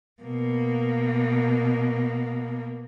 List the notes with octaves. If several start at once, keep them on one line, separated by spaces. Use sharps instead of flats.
B2 A#3